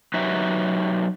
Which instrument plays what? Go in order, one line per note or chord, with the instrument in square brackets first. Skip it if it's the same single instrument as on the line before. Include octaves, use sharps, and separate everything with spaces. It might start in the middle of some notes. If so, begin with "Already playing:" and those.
[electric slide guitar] F#3 D#4 F#4 G4 B4 E5